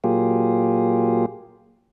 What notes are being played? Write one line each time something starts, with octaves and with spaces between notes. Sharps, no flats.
A#2 F#3 A#3 F4 G4 G#4